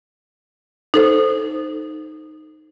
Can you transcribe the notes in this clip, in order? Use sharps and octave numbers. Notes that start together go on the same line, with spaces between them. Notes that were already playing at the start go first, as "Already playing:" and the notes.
D#4 A4 C5